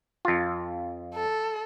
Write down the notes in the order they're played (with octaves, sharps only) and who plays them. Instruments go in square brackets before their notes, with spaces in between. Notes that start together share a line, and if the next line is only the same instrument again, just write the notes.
[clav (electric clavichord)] F2 F4
[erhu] A4